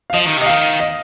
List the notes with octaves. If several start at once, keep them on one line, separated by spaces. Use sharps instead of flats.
F5
F3 D#5
D#3
C3 D#5
D#3 F5
D#5